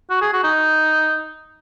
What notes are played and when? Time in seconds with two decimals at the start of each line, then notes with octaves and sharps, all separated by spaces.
0.10 F#4
0.21 G#4
0.33 F#4
0.44 D#4